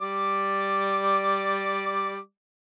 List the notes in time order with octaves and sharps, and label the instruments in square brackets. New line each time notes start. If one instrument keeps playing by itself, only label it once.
[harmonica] G3 D5 D6